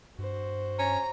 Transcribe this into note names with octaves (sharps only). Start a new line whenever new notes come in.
G2 F#4 C5
C#4 A#5